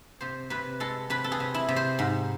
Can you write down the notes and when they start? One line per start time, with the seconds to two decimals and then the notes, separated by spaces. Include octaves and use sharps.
0.21 C3 C5
0.50 C3 B4
0.80 G#3 A4
1.10 C3 B4
1.24 A4
1.32 G#4
1.40 C3
1.54 E4
1.69 C3
1.76 C5
1.99 G#2